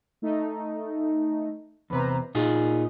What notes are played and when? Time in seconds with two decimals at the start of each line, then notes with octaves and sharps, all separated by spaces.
0.22 A3 D#4
1.90 E2 C3 B4 C5 A#5
2.35 A#2 D#4 F4 G#4